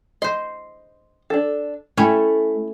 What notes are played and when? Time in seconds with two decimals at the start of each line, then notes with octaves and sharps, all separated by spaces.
0.22 C5 D#5 C6
1.30 D4 A4
1.97 A3 C#4 E4 G5